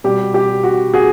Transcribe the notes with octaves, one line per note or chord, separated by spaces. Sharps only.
B2 G3 G4
G4
F#4
F#4 G#4